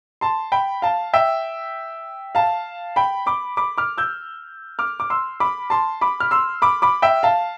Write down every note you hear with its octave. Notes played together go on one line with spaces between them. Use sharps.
A5 C6
G5 B5
F5 A5
E5 G5
F5 A5
G5 B5
B5 D6
B5 D6
D6 F6
E6 G6
D6 F6
D6
C6 E6
B5 D6
A5 C6
B5 D6
F6
C6 E6
B5 D6
B5 D6
E5 G5
F5 A5